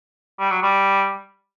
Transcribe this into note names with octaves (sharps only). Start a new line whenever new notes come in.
G3
F#3
G3